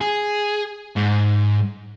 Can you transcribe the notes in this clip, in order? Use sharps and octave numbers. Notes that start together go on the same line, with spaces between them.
G#4
G#2